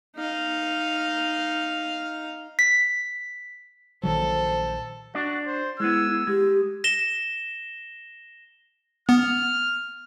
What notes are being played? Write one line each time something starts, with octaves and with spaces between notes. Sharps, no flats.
D#4 F5
B6
A#1 D#3 F#3 A4 C5
D4 F#4 D5
C5
G#3 B3 E4 E6
G#3 G4
A#6 E7 G7
B3 F6